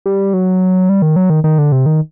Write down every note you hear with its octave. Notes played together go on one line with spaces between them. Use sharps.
G3
F#3
G3
D#3
F#3
D#3
D#3
D3
C3
D#3